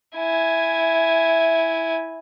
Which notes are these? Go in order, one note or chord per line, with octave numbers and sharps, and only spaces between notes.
E4 G#5